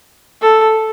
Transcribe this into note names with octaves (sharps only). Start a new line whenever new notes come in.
A4